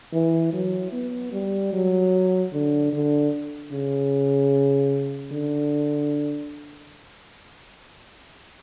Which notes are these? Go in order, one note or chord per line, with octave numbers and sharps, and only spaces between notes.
E3
F#3
B3
G3
F#3
D3
D3
C#3
D3